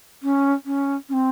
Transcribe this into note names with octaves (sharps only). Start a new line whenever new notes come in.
C#4
C#4
C#4
C4